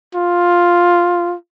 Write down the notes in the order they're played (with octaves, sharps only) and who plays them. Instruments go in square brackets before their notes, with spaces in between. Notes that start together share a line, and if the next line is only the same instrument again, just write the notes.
[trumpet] F4